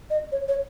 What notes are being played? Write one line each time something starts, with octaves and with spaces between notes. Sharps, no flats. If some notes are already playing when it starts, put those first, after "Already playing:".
D#5
C#5
C#5